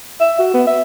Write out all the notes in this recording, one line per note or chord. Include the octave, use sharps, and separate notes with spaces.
E5
F#4
B3
E5